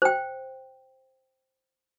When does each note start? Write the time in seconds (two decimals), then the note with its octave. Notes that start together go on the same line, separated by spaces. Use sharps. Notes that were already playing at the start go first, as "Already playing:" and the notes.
0.02 C5 G5